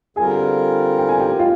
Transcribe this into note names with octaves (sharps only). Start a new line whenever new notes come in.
D3 G3 C4 F4 G#4 A#4 G#5
G5
G#5
G4 G5
F4 F5